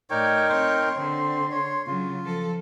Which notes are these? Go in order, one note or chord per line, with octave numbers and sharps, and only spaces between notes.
A2 D#4 A#4 C#5 D5 G5
C4 C#5 C6
D3 C4
C#5
C#3 F#3 F4
F3 A4